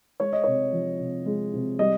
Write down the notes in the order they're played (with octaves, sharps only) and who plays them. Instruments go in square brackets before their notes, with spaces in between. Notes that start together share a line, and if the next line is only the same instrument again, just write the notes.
[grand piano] G#3 C#5
D#5
C3 C#5
F3
C3
G#3
C3
G3 D#5